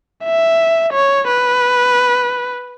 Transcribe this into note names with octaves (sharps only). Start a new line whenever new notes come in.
E5
C#5
B4